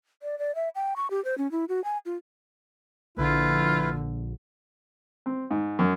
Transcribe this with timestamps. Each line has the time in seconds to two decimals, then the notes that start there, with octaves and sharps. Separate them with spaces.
0.23 D5
0.39 D5
0.55 E5
0.75 G5
0.96 C#6
1.11 G4
1.25 C5
1.38 C#4
1.52 E4
1.69 F#4
1.84 G#5
2.06 F4
3.18 A#1 D3 E4 F4 B4
5.26 C4
5.51 G#2
5.79 F#2